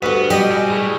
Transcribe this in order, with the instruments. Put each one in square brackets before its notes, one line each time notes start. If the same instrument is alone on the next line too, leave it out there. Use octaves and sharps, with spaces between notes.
[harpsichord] D2 G2 [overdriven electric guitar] B3 [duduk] F#4
[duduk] B2 [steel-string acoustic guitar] G3 [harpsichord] G4 D#5
[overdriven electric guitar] G2 G#5
[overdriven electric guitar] A2 [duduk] G#4